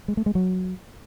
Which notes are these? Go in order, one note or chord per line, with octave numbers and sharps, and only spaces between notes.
G#3
A3
G#3
F#3